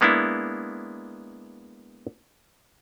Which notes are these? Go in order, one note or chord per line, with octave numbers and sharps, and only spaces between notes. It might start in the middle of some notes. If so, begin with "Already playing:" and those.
G#3 A#3 B3 D4 E4